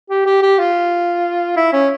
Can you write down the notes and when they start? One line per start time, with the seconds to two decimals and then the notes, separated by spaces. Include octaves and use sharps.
0.10 G4
0.26 G4
0.43 G4
0.59 F4
1.57 E4
1.73 C#4